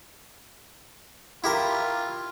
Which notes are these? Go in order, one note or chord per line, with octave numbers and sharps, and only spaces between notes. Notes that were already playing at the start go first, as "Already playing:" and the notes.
E4 F4 G4 A#4